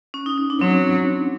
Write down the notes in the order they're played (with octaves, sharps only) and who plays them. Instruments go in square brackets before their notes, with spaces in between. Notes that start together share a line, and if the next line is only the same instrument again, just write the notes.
[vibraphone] C#4
D#4
D#4
D4
[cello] F#3 [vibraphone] C4